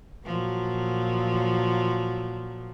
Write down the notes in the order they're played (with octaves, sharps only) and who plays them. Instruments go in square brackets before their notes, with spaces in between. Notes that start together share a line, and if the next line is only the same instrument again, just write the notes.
[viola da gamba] A#2 F3 F#3